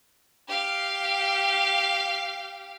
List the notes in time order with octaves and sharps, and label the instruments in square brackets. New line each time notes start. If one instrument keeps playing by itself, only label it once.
[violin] G4 F5